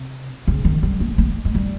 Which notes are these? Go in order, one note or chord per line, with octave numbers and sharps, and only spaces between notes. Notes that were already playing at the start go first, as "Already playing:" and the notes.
Already playing: C3
C#3
D#3
G3
A#3
A#3
G#3
G3